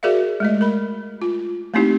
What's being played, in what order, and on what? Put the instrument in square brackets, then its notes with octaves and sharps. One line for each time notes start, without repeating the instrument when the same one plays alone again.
[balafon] F#4 G#4 A#4 D5 E5 F5
G#3 A3 D#5
A#4 B5
F4
A3 A#3 C4 D#4 E4 G4